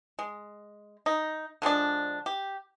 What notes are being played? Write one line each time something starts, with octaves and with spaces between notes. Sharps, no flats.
G#3
D#4
D3 F3 G#3 D4
G4